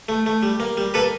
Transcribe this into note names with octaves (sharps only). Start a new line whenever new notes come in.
A3
A3
G3
A#3
G3
A#3 A4 B4